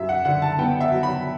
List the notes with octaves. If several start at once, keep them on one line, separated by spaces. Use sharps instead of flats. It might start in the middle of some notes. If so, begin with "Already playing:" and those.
Already playing: F#2 E5
F#5
D3 F#5
A5
B3 G5
E5
F#3
B5